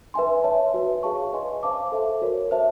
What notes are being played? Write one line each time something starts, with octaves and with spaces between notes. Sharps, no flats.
B4 E5 G#5 C6
C#5 E5 A5
F#4 B4 E5
G#4 C#5 F5 A5 C#6
B4 D#5 G#5 C6
C5 F5 A5 D6
A4 C5 E5 A5
F#4 A#4 C#5
C5 E5 A5